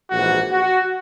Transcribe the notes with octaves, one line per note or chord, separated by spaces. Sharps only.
A#1 G#2 E3 F#4
F#4